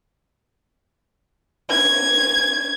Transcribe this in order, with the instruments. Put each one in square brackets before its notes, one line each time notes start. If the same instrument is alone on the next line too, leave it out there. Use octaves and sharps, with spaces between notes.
[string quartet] G#6